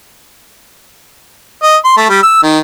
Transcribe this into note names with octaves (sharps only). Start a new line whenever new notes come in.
D#5
C6
A3
G3
E6
D#3